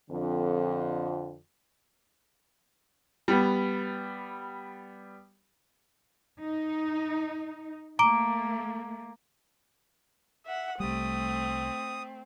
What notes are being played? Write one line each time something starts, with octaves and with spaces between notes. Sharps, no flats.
F2 D3
G3 B3
D#4
A3 A#3 A#5 D6 D7
E5 F#5
C2 G3 A3 C4 D#6